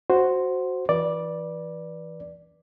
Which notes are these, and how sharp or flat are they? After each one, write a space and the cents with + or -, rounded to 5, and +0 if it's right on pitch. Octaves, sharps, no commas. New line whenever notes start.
F#4 +0 C5 +0
E3 +0 B4 -25 D5 +0